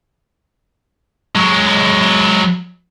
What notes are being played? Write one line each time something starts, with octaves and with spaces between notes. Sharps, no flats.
F#3 G#3